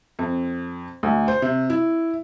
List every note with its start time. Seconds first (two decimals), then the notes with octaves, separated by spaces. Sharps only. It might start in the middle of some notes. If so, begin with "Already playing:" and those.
0.19 F2
1.03 D2
1.28 C5
1.42 C3
1.70 E4